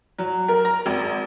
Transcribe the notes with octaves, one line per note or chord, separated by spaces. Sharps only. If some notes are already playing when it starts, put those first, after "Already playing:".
F#3
A#4
A#5
G#1